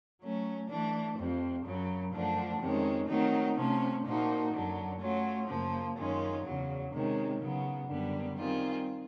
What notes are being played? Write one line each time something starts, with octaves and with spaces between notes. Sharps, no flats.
F#3 A3 C#4
E3 A3 D4
F2 C3 F3
F#2 C#3 F#3
F#2 D3 F3 A3 D4
F2 C3 D#3 G#3 C#4
D#3 F#3 A3 C4 D#4
C3 F3 A3 C#4
A#2 F3 A#3 D#4 F#4
F#2 D3 F#3
F#3 A3 C#4 F4
F#2 C#3 F3 A#3
F#2 D#3 G#3 C#4 F4
E2 C#3 F#3
C3 D#3 G#3 C#4
C#3 F#3 B3
F#2 D3 G3 B3
D#3 G3 C4 F4 G#4